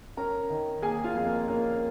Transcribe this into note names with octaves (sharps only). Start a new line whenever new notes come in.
C#4 A#4 A#5
D#3
A#3 G#4 G#5
F4 F5
F2 G#4
A#3 A#4
A#3 C#4 A#4